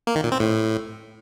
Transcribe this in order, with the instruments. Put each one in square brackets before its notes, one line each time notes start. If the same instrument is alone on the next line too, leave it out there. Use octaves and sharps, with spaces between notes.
[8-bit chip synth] A#3
D#3
A#2
C4
A2